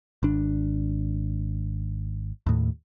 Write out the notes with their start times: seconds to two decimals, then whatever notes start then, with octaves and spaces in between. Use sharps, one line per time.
0.23 G#1 D4
2.46 D#2 A2